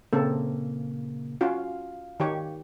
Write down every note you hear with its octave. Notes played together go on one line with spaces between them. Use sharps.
A#2 C#3 A#3 C4 A4
C#4 F4 F#4 F5
D#3 G4 C#5